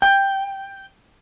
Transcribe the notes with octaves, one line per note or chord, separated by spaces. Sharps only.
G5